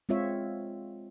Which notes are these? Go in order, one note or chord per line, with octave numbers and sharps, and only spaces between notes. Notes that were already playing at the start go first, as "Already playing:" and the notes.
G#3 C4 F4 C#5 E5